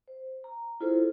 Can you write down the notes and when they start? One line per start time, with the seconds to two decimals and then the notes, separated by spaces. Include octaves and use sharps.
0.08 C5
0.44 A#5
0.80 E4 F4 G#4 A4 C5